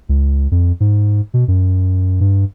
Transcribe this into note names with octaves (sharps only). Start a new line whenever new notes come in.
C#2
F2
G#2
B2
F#2
G2